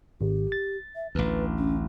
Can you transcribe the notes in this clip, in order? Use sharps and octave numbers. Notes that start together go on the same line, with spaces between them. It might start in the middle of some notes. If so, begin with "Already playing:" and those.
G#1 G4
A6
E5
A1 D2 B4
C#4